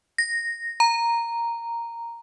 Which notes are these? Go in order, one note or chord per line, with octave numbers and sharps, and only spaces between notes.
A#6
A#5